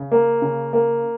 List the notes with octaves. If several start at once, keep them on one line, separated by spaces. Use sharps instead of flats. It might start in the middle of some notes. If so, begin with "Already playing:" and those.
Already playing: C#3
A#3
C#3
A#3